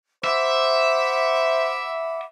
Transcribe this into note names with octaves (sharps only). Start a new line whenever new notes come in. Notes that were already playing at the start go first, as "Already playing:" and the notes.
C5 E5 F#5 B5 D6